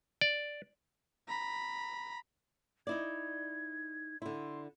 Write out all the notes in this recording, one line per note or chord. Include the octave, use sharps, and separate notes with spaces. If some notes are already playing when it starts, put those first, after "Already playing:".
D5
A#5 B5
D#4 E4 D5 G#6
D3 E4 C6